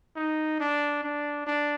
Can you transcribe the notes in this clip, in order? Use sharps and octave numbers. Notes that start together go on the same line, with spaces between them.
D#4
D4
D4
D4